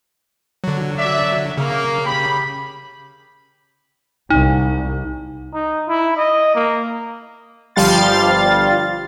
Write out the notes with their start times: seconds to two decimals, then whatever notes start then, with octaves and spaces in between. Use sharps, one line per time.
0.64 D3 F#3
0.98 D5 E5
1.57 C#3 A#3
2.05 G4 B5
4.30 C2 D#4
5.54 D#4
5.88 E4
6.17 D#5
6.55 A#3
7.76 G1 F3 G3 F5 C6 A6